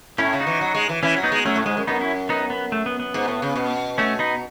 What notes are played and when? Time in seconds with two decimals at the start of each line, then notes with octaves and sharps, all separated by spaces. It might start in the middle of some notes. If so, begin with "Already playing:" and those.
0.18 A2 C#4 E4
0.33 C#3
0.40 D#4 F#4
0.47 E3
0.61 F#3
0.75 G#3
0.89 E3
1.03 E3 C#4 E4
1.17 F#3
1.23 B3 D#4
1.32 G#3
1.45 F#3 A3 C#4
1.56 A2
1.66 G#2 G#3
1.77 F#2
1.87 F#2 B3 D#4
2.01 C#4 E4
2.29 B3 D#4
2.50 B3
2.72 A3
2.86 B3
3.00 B3
3.14 G#2
3.28 A2
3.42 C#3
3.55 B2
3.98 A3 C#4
4.19 B3 D#4